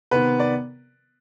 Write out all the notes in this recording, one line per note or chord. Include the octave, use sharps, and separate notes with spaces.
C3 D#3 B3 B4
D5